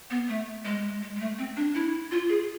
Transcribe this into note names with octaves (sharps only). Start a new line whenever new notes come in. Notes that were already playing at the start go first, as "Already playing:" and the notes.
B3
A3
G#3
G#3
G#3
A3
C4
D4
E4
F4
G#4